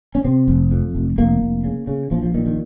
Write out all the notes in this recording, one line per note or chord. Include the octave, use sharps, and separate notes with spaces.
C#4
C3 C4
F1
F2
F1
F1 A#3
F1
C#3
C#3
A#1 F3
F3
A#2 D#3
D#3